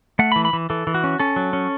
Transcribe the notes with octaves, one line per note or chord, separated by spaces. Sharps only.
A3 F#5
B5
E3
B5
E3
E3 A4
E3
F#4
C#4
C#4 A4
F#3
C#4